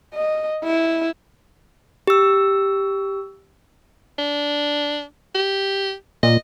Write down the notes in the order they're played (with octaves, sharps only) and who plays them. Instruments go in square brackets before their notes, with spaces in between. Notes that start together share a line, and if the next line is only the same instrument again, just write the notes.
[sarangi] D#5
E4
[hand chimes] G4 E6
[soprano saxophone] D4
G4
[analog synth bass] A#2 [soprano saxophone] D#5